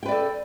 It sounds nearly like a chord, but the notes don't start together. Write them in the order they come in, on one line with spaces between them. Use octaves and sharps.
G5 B4 D5 A4